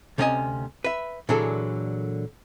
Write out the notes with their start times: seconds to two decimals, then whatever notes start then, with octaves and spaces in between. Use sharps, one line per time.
0.18 D2 C3 C#4 F4 D#5 G#5
0.84 B4 E5
1.29 A#2 D3 E3 F#3 G#4 A4